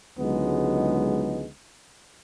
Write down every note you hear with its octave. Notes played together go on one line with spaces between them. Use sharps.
C#2 D3 F#3 G#3 B3 D#4